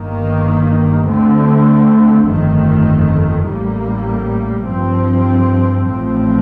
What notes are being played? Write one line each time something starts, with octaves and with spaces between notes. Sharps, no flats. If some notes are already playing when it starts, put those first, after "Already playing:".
Already playing: G1 G2 D#3 A#3
D2 D3 A3 C4
G1 F2 D#3 A3
A1 A2 G3 A#3
G2 F3 C4
A1 A2 F3 C4